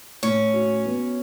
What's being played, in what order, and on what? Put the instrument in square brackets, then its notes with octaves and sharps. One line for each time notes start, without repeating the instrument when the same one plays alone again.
[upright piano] A2 [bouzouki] C#4
[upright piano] F#4
B3